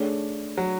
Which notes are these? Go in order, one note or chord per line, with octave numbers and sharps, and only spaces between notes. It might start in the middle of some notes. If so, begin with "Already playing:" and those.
Already playing: A3 D4 G#4 C#5
F#3